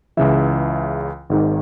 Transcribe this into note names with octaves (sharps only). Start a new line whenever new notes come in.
C#2 C#3 E3 E5
G#1 G#2 D#3